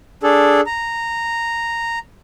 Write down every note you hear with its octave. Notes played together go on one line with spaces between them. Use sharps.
D4 G#4 A4
A#5